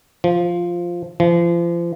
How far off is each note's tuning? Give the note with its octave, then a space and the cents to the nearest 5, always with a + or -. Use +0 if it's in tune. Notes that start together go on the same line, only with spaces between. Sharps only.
F3 +0
F3 -35